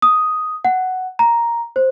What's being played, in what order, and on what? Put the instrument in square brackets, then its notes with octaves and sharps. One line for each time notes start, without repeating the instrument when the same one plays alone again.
[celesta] D#6
F#5
A#5
C5